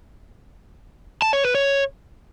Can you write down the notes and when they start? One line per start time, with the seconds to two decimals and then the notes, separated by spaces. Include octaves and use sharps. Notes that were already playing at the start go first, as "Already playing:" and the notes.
1.22 A5
1.33 C#5
1.44 B4
1.55 C#5